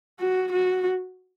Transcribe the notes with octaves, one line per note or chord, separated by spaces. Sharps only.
F#4
F#4